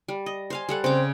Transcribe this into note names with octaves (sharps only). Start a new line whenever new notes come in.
G3
D#5
C5 F5 G#5
G3 A4 F#5
C#3 C4 D6